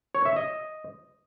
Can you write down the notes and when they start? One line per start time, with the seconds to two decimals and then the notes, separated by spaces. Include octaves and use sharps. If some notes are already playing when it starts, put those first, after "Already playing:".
0.15 C#5
0.25 E5
0.36 D#5